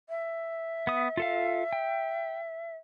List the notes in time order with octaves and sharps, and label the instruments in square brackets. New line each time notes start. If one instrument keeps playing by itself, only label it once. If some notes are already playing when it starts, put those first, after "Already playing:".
[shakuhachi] E5
[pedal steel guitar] B3 D#6
F4 A4 F5
G5